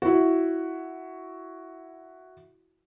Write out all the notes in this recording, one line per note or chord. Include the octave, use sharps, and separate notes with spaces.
E4 F#4